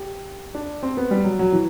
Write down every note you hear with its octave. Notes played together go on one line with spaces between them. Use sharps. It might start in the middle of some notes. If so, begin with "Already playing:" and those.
Already playing: G4
D4
C4
B3
G3
F#3
F#3
E3